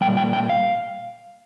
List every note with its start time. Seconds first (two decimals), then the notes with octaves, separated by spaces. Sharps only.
0.01 A#2 G3 G5
0.17 G5
0.33 G5
0.50 F5